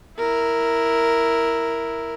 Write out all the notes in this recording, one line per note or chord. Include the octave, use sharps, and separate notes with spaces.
E4 A#4